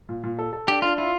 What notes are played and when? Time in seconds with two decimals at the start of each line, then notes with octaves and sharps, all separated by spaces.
0.09 A#2
0.24 A#2
0.39 A4
0.53 A4
0.67 D4 G4
0.82 D4 F4
0.98 E4 F4